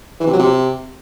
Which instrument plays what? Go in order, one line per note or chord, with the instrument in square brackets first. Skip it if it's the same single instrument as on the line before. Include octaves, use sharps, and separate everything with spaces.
[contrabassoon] E3
C3
F#3
C3